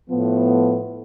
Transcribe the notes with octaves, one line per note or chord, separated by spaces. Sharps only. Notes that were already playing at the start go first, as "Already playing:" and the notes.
A2 F3 B3